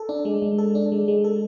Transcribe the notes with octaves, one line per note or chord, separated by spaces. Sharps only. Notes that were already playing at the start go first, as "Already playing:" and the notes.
Already playing: A4
D4
G#3
G#3
A4
D4
G#3
G#3
A4